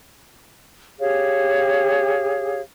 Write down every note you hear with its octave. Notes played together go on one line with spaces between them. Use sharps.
G4 G#4 C#5 F5